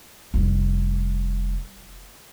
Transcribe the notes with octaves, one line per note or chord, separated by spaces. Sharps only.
F1 G3